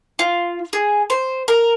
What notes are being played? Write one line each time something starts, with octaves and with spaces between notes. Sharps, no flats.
F4
G#4
C5
A#4